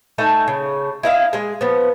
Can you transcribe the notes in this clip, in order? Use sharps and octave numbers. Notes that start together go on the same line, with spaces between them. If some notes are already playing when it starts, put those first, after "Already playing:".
A3 D#4 A4 G#5
C#3
E4 D#5 F5
G#3 G#4
F3 B3